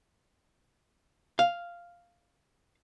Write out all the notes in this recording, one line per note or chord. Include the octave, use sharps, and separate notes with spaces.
F5